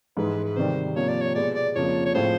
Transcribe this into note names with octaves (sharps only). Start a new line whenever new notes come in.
G#2 E3 G#3 B4
B4
C3 D#3 G3 C5
C3 F3 A#3 C#5
D5
C#5
B2 G#3 B3 D5
D5
F2 C#3 F3 A#3 C#5
C#5
A2 F3 G#3 C4 F4 C5